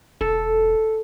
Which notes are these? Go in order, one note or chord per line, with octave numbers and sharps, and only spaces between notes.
E1 A4